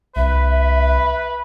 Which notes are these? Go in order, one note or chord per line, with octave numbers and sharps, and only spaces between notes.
C2 B4 E5